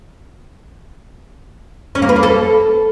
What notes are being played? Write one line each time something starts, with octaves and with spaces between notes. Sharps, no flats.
C#4
A#3
B4
A#3
A4